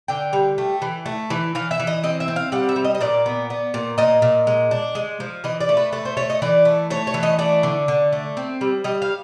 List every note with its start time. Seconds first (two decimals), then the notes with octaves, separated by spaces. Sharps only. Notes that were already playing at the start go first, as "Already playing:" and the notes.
0.08 D3 G5
0.33 G3
0.58 A3
0.82 E3
1.06 A3
1.30 E3
1.55 E3 F5
1.71 E5
1.80 E3
1.87 D#5
2.03 C4 D#5
2.20 E5
2.28 C4
2.36 F5
2.52 G3 F#5
2.69 E5
2.76 G3
2.84 D#5
2.95 D#5
3.01 A#2 D5
3.26 B3
3.50 B3
3.74 A#2
3.98 A#2 D#5
4.22 A#2
4.47 G#3
4.71 D4
4.95 G#3
5.20 F3
5.44 E3 D#5
5.60 D5
5.69 A3
5.77 B4
5.93 A3 B4
6.05 C5
6.17 A3 C#5
6.30 D#5
6.42 E3 D5
6.65 A3
6.90 A3 C#5
7.07 C#5
7.14 E3
7.23 D#5
7.39 A3 D5
7.63 D3
7.88 D3
8.12 A3
8.37 C4
8.61 G3
8.84 G3 D#5
9.02 F5